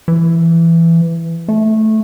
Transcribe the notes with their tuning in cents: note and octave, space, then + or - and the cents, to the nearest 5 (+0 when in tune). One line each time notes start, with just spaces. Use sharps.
E3 +15
A3 -10